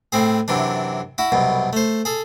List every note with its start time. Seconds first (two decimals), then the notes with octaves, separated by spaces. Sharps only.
0.12 A2 C4 G#4
0.48 F#2 C3 E3 D4
1.18 E4 F#4
1.32 C2 F#2 B2
1.73 A3 C5
2.05 G#4 A4